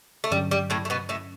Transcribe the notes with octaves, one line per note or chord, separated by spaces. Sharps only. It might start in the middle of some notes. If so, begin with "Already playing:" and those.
A3
G2 D3 F#3 G3 C#4
G3
A2 A3
A3
B2 B3
A2 A3